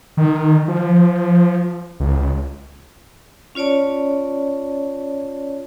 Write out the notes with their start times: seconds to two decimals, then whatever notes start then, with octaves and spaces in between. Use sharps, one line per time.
0.17 D#3
0.68 F3
2.00 C#2
3.55 C#4 F4 C#5 D5 A5